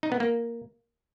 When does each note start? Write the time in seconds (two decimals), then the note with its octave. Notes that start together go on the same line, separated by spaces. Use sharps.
0.03 D#4
0.12 B3
0.20 A#3